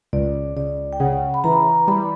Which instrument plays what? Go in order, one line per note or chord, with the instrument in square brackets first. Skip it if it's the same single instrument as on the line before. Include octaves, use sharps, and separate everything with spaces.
[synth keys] C#2 [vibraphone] D5
[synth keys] C#2 [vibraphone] D5
[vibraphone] G5
[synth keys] C#3 [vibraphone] F#5
[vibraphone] B5
[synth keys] E3 [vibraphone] A#5
[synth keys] G3 [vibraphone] B5